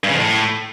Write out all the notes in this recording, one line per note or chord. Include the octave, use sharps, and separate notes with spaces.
G2
C#3
F2
A2